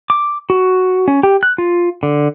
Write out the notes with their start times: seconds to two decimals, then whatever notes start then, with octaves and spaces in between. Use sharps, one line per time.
0.10 D6
0.50 F#4
1.08 C#4
1.23 G4
1.43 F#6
1.58 F4
2.03 D3